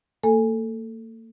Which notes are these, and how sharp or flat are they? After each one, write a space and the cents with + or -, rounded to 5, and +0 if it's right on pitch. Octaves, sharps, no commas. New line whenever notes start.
A#3 -45 A4 +0 G#5 -10